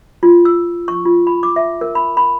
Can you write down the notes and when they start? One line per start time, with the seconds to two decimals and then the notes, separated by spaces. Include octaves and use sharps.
0.23 F4
0.45 E6
0.88 C#6
1.05 F4
1.27 B5
1.43 D6
1.56 E5
1.81 A#4
1.95 B5
2.17 B5